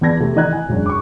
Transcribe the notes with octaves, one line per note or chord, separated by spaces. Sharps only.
E2 B3 D5 A5 G#6 A#6
C3 A3
E3 D#5 A#5 F#6 G#6
G#5
E1 F#2 D4
C#6 D6